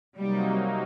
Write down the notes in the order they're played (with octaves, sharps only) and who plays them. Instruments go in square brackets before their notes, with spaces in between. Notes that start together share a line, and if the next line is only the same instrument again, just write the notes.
[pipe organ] C3 F#3 A#3 D#4 [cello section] G3